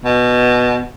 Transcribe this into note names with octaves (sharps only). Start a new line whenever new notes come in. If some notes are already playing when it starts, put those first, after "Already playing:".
B2